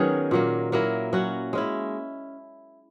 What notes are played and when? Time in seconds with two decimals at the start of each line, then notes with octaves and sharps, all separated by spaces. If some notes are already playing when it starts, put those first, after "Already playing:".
Already playing: D#3 F#3 B3 C#4 D#4 G#4
0.31 A#2 F#3 A#3
0.72 F#3 A#3 E4 A#4
1.13 F#3 C#4 F#4
1.53 G#3 C#4 E4